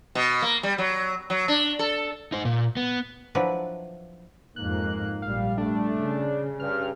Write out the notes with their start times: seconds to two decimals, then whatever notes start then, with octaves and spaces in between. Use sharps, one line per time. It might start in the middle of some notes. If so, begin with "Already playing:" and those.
0.15 B2
0.42 A#3
0.63 G3
0.78 F#3
1.30 F#3
1.48 D4
1.79 A4
2.32 D#4 C5
2.45 A#2
2.77 B3
3.35 F3 F#3 D4 E4 B4
4.56 F2 G#2 A#3 D#4 F#6
5.22 A#1 G3 F5
5.58 A3 D4
5.95 C#3
6.60 G2 F6